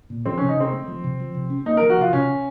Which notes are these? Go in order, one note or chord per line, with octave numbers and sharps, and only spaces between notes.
A#2
F3 C4
C3 C#4
D#4
C3 C4
A3
F3
C3
F3
C3
C#4
A#3 D#4
F3 A#4
F#4
C3 F4
C3 C#4